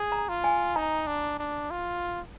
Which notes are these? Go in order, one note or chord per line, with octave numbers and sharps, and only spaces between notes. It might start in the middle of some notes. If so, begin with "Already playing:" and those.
Already playing: G#4
A#5
F4
G#5
D#4 A#5
D4
D4
F4